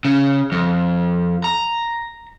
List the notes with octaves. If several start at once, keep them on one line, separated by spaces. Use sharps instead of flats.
C#3
F2
A#5